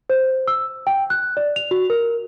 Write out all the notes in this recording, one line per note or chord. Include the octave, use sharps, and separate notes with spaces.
C5
E6
G5
F#6
D5
F7
F#4
A#4